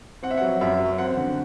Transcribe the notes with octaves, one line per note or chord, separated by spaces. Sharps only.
C4 F#5
E5
F#3 F#5
F#2 E5
F#3
C4 F#5
D3